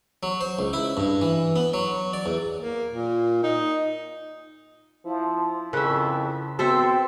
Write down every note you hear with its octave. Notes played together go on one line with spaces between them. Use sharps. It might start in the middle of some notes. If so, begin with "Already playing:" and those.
F#3
C5
C#2
E4
G2
E3
B3
F#3
D5
E2
A#3
A#2
D#4
F3 E4
F2 C#3 A#4 E5 F#6
B3 C4 F#4 A4 C5 E5